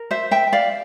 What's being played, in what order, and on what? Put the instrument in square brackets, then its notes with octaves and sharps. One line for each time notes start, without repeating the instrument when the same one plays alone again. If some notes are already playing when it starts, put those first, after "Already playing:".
Already playing: [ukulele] A#4
C5 E5
E5 G5
D5 F5